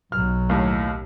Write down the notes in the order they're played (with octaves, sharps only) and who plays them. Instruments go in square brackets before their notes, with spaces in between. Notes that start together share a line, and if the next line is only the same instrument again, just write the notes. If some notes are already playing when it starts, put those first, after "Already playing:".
[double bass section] B1 [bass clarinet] F#3 [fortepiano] F6
[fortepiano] D#2 A2